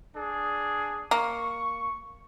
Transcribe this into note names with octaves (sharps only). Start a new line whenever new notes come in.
D4 G#4
A#3 C#6